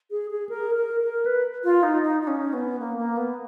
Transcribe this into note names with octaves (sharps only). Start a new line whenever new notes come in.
G#4
G#4
A#4
A#4
A#4
B4
F4
D#4
D#4
D#4
C#4
B3
A#3
A#3
B3